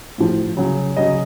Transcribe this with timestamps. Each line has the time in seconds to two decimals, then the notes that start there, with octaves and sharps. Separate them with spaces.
0.18 A2 F3
0.57 C#3 F#3
0.97 C#3 F#3 D#5